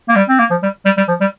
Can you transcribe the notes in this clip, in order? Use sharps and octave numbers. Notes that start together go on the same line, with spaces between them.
A#3
G3
C4
A#3
F3
G3
G3
G3
F3
G3